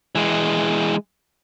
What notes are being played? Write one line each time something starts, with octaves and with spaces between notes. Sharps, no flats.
E3 G#3